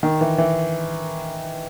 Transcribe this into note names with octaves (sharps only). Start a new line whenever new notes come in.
D#3
E3
E3